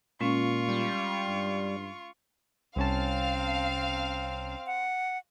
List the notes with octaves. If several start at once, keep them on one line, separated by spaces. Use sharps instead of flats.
A#2 G#3 C#4 F4 C#6
G3
G2
C2 C4 C#4 F5 A5
F#5